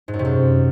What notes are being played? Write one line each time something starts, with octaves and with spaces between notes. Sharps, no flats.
G#2
F#2
C3
F#2